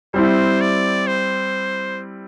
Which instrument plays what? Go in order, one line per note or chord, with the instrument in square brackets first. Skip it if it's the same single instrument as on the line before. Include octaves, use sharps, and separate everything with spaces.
[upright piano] G3 C4 E4 [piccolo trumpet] C5
[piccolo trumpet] D5
C5